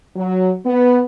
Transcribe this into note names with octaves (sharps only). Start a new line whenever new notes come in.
F#3
B3